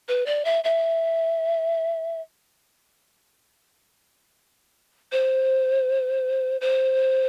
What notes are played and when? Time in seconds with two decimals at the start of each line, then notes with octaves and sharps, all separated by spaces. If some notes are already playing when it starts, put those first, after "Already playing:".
0.08 B4
0.26 D5
0.45 E5
0.64 E5
5.12 C5
6.61 C5